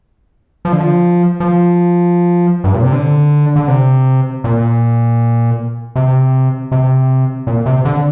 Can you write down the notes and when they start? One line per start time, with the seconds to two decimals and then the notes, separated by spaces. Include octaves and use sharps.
0.65 F3
0.72 D3
0.80 F3
1.40 F3
2.64 G2
2.73 A#2
2.82 C3
2.92 D3
3.56 D3
3.68 C3
4.44 A#2
5.96 C3
6.72 C3
7.47 A#2
7.66 C3
7.85 D3